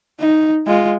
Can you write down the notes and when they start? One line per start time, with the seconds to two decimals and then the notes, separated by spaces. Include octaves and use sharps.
0.20 D#4
0.67 G#3 F4